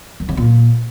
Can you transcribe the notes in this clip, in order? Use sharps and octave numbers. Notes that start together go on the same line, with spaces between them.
F#2
C#3
A#2